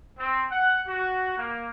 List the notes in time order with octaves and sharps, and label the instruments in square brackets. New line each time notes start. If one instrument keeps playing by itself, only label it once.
[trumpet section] C4
F#5
F#4
A#3